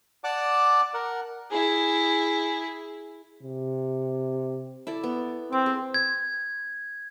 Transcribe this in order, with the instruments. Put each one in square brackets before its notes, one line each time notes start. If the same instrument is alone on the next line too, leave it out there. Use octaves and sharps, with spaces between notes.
[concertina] D5 F#5 A5 D6
A#4 F#5
[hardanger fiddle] E4 G#4
[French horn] C3
[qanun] E4 A4 D5
B3
[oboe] C4 [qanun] D6
[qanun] G#4
[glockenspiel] G#6